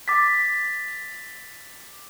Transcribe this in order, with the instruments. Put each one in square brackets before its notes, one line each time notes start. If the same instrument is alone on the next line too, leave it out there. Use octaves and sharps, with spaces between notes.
[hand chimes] D6 A6 B6